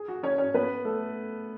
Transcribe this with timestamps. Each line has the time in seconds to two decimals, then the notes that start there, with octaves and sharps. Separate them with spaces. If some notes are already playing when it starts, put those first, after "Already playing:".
Already playing: G#4
0.08 F#4
0.23 C#4 C#5
0.38 C#4 C#5
0.54 B3 B4
0.85 A3 A4